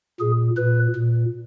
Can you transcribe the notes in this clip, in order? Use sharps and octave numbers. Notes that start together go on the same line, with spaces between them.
A#2 G#4
A#2 B4
A#2